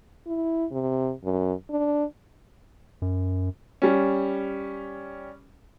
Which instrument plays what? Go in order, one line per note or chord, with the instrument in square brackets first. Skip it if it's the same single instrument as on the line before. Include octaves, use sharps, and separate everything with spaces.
[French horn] E4
C3
F#2
D4
[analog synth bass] F#2
[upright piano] G3 C#4